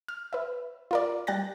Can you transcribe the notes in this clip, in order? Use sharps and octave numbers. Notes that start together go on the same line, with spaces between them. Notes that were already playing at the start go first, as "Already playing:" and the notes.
F6
B4 E5
F4 A#4 D5
G3 G5 F#6 A6 A#6